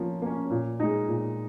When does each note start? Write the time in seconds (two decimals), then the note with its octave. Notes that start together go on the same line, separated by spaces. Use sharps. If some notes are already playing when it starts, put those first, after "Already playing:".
Already playing: F3 A#3 C#4
0.22 A#3 C#4
0.50 A#2
0.80 G#3 D#4
1.08 A#2